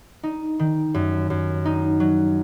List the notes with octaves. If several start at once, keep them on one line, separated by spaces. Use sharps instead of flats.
D#4
D#3
F#2
F#2
D#4
F#3